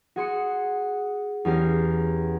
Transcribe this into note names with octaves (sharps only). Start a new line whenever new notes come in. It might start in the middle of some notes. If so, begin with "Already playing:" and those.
F#4 G#4 C6 C#7
E2 C#4 G4 A#5 C7